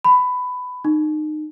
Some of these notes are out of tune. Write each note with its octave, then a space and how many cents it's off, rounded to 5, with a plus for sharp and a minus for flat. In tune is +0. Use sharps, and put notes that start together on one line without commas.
B5 +15
D#4 -25